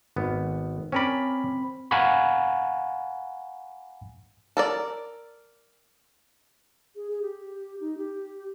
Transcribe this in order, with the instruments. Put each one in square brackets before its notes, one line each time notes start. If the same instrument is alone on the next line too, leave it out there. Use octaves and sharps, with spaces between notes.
[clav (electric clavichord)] G#1 B3
[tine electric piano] C4 B5 [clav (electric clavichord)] C#4 A#4 D5
[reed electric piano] F5 F#5 G#5 A#5 B5 C#6
[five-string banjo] A4 A#4 D5
[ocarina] G#4
G#4
G4
D#4
G4